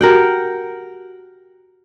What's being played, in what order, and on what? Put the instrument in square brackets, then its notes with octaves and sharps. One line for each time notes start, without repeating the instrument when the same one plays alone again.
[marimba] F#4 G4 [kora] A#4 F#5 G5